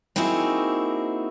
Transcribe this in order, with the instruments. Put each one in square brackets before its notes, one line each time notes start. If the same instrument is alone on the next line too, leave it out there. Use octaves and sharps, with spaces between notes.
[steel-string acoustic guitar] A#3 C4 D#4 E4 F#4 G#4